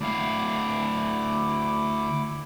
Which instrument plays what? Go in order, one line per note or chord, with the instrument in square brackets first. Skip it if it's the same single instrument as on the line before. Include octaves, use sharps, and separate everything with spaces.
[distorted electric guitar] D2 F5 [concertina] E4 D6